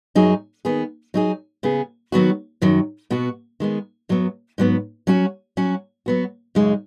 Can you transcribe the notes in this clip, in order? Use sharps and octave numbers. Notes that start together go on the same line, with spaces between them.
F#2 F#3 D#4 G#4
D#3 B3 G#4
F#3 D#4 G#4
C#3 B3 G#4
D#3 F#3 B3 F#4
F#2 D#3 F#3
B2 B3 F#4
D#3 G#3 B3
F#2 F#3 B3
G#2 F#3 B3
F#3 C#4 F#4
F#3 C#4 F#4
F#3 B3 F#4
F#2 C#3 G#3 D#4